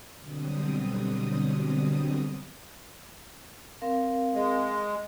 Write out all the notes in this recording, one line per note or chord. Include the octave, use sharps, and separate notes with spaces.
B2 D3 F#3 G3 C4 D#6
C4 A#4 F5
G#3